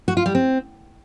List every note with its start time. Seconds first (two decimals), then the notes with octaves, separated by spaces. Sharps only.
0.08 F#4
0.17 F4
0.26 G3
0.35 C4